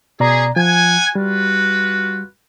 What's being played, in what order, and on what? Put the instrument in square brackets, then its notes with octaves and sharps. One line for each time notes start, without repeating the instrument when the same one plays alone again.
[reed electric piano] B2 D5 A#5 [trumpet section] C#4 G#4
[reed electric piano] F3 [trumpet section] F#5 G#5
[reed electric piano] G3 [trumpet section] F4 F#4 B4